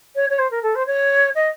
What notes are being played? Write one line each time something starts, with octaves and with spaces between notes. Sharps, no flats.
C#5
C#5
C5
A#4
A4
C5
C#5
D#5